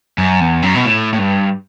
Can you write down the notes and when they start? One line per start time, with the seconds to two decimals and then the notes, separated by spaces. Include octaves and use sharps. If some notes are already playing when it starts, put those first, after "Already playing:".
0.18 F#2
0.40 E2
0.62 F#2
0.75 B2
0.85 A2
1.13 A2
1.18 G2